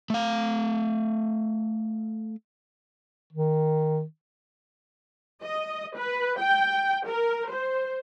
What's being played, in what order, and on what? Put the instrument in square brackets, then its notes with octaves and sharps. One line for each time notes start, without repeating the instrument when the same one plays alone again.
[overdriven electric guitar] A3 F5
[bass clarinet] D#3
[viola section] D#5
B4
G5
A#4
C5